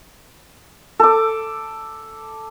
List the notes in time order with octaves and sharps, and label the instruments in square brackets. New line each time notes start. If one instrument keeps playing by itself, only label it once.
[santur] A4 D6